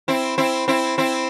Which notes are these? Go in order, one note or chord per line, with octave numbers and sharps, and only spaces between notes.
C4 E4
C4 E4
C4 E4
C4 E4